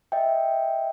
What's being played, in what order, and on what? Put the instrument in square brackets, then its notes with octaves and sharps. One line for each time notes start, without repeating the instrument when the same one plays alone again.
[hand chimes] D#5 E5 G5